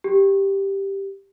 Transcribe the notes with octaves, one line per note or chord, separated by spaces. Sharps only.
G4